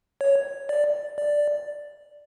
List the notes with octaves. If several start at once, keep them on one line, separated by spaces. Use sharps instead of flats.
C#5
D5
D5